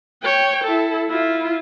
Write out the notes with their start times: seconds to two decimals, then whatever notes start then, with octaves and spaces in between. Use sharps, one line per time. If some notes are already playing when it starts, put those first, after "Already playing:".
0.23 C#5 G5
0.64 E4 A4
1.09 E4 F4